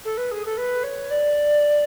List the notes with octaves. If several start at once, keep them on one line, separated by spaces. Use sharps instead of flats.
A4
B4
G#4
A4
B4
C#5
D5